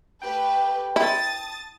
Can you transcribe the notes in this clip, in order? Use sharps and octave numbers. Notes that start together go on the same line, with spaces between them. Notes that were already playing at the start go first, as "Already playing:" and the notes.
A3 G4 B4 G5
E4 A5 D#6 A6